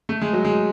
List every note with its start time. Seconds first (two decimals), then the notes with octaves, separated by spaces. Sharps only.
0.09 A3
0.21 G#3
0.33 F#3
0.45 G#3